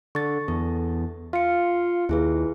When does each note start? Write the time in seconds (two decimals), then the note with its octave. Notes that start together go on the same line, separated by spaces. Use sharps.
0.15 D3 C#6 A6
0.48 E2 A4
1.33 F4 F5 C#7
2.09 D#2 E4 G#4 B4